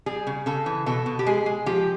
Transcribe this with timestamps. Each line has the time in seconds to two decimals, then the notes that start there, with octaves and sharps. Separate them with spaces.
0.06 G3 G#4
0.27 C#3
0.46 C#3 A4
0.66 E3
0.86 B2 A4
1.06 B2
1.19 G4
1.26 G#3 G#4
1.46 G#3
1.66 F3 G4